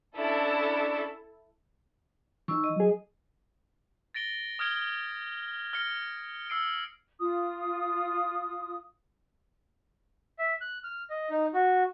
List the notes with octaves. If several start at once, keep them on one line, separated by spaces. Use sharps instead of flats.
C#4 D4 E4 A4
E3 D#4 C#6 E6
D#5
F#3 G#4
A6 A#6 D7 G7
D#6 F6 G#6 D7 G7
F6 A#6 C#7
E6 C7 D7
F4 D#6
E5
F#6
F6
D#5
D#4
F#4